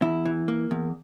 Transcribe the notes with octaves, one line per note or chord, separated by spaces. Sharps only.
E2 E4
E3
A#3
E2